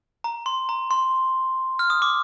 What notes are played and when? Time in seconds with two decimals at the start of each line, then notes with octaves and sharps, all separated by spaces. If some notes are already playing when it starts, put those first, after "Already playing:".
0.24 A#5
0.46 C6
0.69 A#5
0.91 C6
1.79 F6
1.90 D#6
2.02 D6